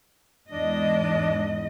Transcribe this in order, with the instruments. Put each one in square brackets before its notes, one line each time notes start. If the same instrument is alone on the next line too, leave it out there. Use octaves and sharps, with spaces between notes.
[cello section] E2 G#2 D#5 [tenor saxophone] D4